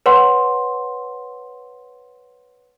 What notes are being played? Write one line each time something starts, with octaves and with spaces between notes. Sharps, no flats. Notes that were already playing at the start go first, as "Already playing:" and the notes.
B4 C#5 F#5 C6